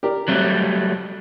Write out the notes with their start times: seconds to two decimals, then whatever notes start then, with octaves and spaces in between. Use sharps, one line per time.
0.03 G4 A#4 D5
0.28 F#3 G3 A3 C4 F#6